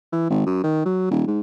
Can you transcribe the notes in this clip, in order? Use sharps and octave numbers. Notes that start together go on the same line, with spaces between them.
E3
G#1
F#2
D#3
F#3
D#1
G#2